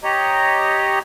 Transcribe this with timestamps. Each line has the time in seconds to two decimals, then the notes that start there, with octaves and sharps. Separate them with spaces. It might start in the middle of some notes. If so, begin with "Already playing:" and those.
0.04 G4 C#5 D#5 A#5